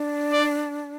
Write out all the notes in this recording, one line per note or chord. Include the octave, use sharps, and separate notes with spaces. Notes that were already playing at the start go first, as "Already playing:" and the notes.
Already playing: D4
D5